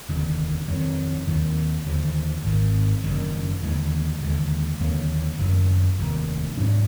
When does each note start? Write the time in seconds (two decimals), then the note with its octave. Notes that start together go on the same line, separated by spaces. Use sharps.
0.09 F1 D#2 D3
0.68 F2 D#3 F#3
1.27 D#2 D#3 F#3 A#3
1.86 D#2 D3 F3
2.45 G#1 G#2 D#3
3.04 F#1 F#2 D#3
3.62 D#2 D3 G#3
4.22 D#2 D3 G#3
4.80 D#2 D3 F#3 A#3
5.39 F#1 F#2 D#3
5.99 F1 D#2 D#3
6.57 G#2 F#3 D4